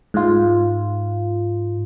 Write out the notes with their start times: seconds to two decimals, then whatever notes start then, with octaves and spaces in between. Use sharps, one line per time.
0.14 G#2 F4